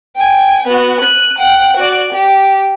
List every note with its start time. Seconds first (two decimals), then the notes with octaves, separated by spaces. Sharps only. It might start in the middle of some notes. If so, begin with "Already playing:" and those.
0.16 G5 G#5
0.67 B3 F#4
1.00 F#6 D#7
1.39 F#5 G5
1.77 F#4 D5
2.13 G4